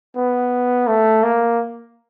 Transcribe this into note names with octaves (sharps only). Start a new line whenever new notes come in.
B3
A3
A#3